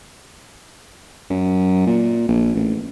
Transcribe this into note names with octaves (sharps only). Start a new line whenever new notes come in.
F#2
A#2
A#1
A1